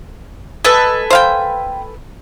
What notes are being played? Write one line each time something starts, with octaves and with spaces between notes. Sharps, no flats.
A4 B4 D#5 G#5
C5 F5 G5